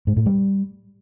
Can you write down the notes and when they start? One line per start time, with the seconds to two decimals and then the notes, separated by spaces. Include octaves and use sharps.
0.07 G#2
0.17 A2
0.26 G3